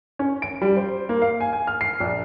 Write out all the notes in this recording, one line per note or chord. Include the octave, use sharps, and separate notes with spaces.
C#4
D7
G3
C5
A#3
F5
G#5
G#5
F6
C7
A#1